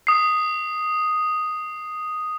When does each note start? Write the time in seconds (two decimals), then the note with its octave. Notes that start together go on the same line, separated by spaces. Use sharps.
0.07 D#6 C7